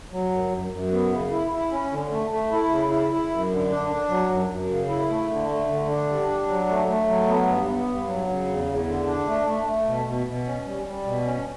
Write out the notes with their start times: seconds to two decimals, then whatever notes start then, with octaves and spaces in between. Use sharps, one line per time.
0.12 F#3
0.31 F#2
0.52 F#2
0.71 F#2
0.92 B3
1.11 C#3
1.31 E4
1.51 E4
1.71 C#4
1.92 D3
2.11 A3
2.31 A3
2.51 E4
2.70 C#3
2.90 E4
3.11 E4
3.30 F#2
3.50 D3
3.70 D4
3.90 D4
4.09 F#3
4.29 F#2
4.49 F#2
4.69 C#3
4.89 E4
5.09 A3
5.29 D3
5.49 A3
5.69 D3
5.88 D4
6.09 G3
6.28 D4
6.48 F#3
6.68 A3
6.88 A3
7.08 F#3
7.28 B3
7.47 G2
7.67 B3
7.88 G2
8.07 F#3
8.28 C#3
8.47 E2
8.66 E2
8.86 D3
9.06 D4
9.27 A3
9.46 A3
9.67 A3
9.86 B2
10.06 B2
10.27 B2
10.47 C#4
10.65 G3
10.86 G3
11.05 B2
11.25 C#4